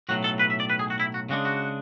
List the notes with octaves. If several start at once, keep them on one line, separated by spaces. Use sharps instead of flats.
B1 A2 F#3 F#4
A4
B4
E5
D5
B4
G#4
F#4
E4
F#4
C#3 G#3 D4 F#4
F#4